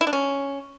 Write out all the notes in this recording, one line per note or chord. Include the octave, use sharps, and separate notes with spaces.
E4
D4
C#4